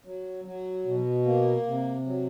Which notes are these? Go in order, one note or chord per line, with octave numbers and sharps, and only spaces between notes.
F#3
F#3
B2
A#3
C3
F#3